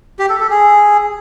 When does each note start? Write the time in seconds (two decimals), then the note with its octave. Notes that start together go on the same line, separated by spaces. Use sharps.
0.19 G4
0.29 A4
0.40 A4
0.50 G#4